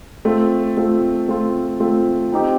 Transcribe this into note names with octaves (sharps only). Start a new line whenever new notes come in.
A3 C4 F4
A3 C4 F4
A3 C4 F4
A3 C4 F4
C4 D#4 G4